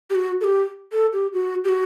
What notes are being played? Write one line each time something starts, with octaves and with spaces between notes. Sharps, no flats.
G4
F#4
A4
G4
A4
G4
F#4
G4
F#4